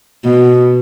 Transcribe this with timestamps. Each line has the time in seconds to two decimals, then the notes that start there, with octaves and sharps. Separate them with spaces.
0.24 B2